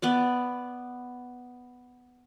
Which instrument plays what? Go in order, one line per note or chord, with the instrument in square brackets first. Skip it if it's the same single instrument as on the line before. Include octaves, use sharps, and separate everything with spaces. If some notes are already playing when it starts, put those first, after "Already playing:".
[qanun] B3 B4 D5